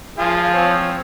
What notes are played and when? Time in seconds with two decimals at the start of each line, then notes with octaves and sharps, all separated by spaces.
0.18 F3 F4 G#4 G#5
0.54 C4 C#5